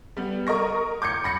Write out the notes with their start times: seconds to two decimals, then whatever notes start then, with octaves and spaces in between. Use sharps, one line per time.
0.17 G3 B3
0.47 A#4 D#5 C#6 A#6
1.02 D6 G6 G#6 C#7
1.24 B5 A#6 C#7